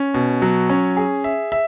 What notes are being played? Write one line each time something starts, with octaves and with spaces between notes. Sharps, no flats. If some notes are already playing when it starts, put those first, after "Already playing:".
Already playing: C#4
B2
F#3
C#4
G#4
E5
E5